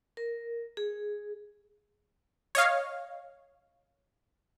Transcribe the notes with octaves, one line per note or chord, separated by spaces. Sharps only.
A#4
G#4
C#5 D#5 F5